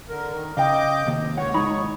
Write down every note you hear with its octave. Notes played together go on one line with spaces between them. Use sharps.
D3 A#4
D#3
C#3 D#5 F5 G5 D6 G6
C3 D#3 A#3
C#2 C#5 F#5
G#1 G#3 D#4 B5